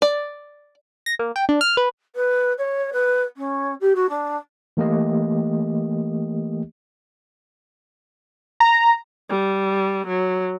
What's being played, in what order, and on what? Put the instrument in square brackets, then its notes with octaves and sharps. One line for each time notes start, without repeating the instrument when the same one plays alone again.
[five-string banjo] D5
[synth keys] A#6
A#3
G5
D4
F6
B4
[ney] B4
C#5
B4
C#4
G4
F#4
D4
[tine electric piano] E3 A3 A#3 G4 D#5
[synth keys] A#5
[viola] G3
F#3